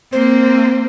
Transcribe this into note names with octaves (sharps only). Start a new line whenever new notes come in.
A#3 C4 C5